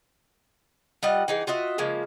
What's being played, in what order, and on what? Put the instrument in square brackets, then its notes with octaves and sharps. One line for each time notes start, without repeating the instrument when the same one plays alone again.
[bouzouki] G3 F4 D#5 F#5
E3 D#4 G#4
F4 F#4 D#5 E5
C#3 F3 G#3 A#3